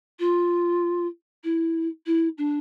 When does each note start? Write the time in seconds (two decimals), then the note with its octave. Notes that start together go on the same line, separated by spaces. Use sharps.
0.19 F4
1.44 E4
2.06 E4
2.38 D4